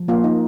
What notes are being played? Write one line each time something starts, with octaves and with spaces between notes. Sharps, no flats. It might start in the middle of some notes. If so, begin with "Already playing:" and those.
Already playing: F3
A#3 F4
D#4